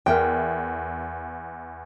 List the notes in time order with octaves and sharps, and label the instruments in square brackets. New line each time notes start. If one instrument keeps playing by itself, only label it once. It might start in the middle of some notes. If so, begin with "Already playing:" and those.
[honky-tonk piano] E2 [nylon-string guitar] A#4 E5 G5